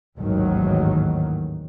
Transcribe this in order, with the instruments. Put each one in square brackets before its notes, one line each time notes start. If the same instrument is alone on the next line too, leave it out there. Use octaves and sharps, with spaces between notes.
[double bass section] A1 D#2 G#2 D#3 F#3